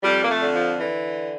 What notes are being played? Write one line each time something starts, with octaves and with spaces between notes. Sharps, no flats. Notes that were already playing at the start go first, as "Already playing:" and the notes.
F2 G3
A#3
A3
D3
F3
D3 E3